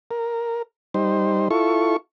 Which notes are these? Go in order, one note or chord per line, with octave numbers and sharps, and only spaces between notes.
A#4
G3 D#4 C5
E4 F4 A4 C#6